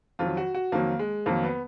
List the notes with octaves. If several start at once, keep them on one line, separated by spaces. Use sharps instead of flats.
F2 D#3 F#3 F4
F#4
F#4
F2 D#3 F#3 A#3
G#3
F2 D#3 F#3 A#3
B3